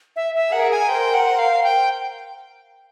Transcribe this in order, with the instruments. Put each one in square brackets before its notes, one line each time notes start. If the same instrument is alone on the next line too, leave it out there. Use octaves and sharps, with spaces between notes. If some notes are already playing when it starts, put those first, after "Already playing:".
[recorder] E5
E5
[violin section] G#4 A#4 [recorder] F#5
[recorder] G#5
[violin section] A#4 C5 [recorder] G5
[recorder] F#5
F5
G5